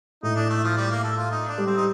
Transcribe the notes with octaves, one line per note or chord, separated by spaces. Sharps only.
A2 D#4
D4
A3
F3
G3
A#3
A4
F4
D#4
D4
G3
C4
D#4